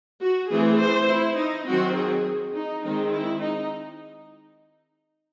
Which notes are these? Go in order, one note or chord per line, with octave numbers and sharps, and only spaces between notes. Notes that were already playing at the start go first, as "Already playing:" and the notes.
F#4
E3 A3 C4 G#4
C5
E4
D#4
D#3 F#3 C4 F#4
G#4
D#4
D#3 G#3 C4 D#4
E4
D#4